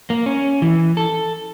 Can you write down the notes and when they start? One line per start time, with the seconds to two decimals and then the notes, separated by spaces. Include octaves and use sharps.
0.10 A#3
0.26 C#4
0.62 E3
0.97 A4